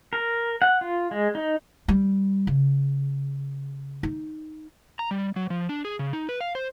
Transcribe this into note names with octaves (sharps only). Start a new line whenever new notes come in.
A#4
F#5
F4
G#3
D#4
G3
C#3
D#4
A#5
G3
F#3
F3
D4
G#4
C#3
D#4
B4
F5
C5